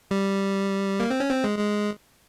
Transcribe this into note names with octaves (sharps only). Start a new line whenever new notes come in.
G3
A#3
C4
C#4
C4
G#3
G#3